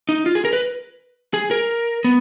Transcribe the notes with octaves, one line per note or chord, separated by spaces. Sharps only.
D#4
F4
G#4
A#4
B4
G#4
A#4
B3